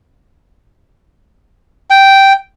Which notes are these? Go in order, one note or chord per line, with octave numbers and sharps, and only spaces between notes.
G5